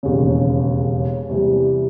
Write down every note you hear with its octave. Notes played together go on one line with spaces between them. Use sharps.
E1 D#2 C#3
E2 C3 E3 G3